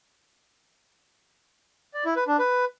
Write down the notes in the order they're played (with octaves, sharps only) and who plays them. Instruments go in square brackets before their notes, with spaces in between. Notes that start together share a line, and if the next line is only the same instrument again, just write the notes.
[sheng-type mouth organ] D5
E4
B4
D4
B4